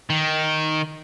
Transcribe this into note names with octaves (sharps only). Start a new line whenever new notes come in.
D#3